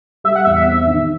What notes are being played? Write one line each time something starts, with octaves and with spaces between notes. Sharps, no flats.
G3 E5
F#5
E2 E5
E5
C4
D#3